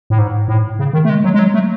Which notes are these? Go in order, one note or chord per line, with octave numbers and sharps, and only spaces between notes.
A2
G#2
A2
C#3
D#3
A3
G#3
F#3
G#3
F#3
A3